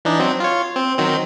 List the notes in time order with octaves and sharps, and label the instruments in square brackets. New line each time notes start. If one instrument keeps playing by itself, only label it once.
[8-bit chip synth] E3 D4 D#4
F#3 C4
F4 C#5
C4
D#3 F#3 C4